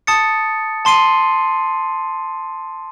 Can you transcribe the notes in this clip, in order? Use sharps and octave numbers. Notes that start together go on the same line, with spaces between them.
A5 D#6 A6 C#7
A5 C6 C7 D#7